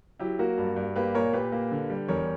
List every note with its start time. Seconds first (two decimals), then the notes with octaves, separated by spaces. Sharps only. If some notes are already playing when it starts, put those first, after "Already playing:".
0.20 F#3 E4 G4
0.39 A#3 F#4 A#4
0.58 G2
0.76 G2
0.96 A#3 G4 B4
1.15 A#2 A#4 C#5
1.33 A#2 G4 B4
1.52 A#3
1.71 D3
1.90 G3
2.08 E2 A#4 C#5